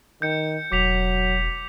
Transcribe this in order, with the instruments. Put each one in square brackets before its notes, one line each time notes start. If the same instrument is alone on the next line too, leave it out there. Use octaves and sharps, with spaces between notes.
[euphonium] D#3 [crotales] G6 C#7
[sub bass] E1 [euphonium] F#3 [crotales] D6 B6 F7